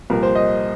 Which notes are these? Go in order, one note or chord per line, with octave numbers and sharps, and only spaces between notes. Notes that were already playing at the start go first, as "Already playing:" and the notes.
C2 A#2 F3 A#4
C5
D#5